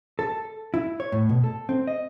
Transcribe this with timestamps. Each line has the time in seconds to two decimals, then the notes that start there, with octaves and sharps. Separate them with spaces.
0.19 A4
0.74 E4
1.00 C#5
1.12 A2
1.29 B2
1.44 A4
1.69 C4
1.87 D#5